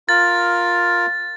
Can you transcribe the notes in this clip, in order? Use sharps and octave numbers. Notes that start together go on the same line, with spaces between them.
F4 A#4 A6